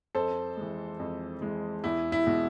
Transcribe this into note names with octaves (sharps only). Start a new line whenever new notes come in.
F2 A4 C5
E3 G#3
F2
E3 G#3
E2 E4
E4
B2 G#3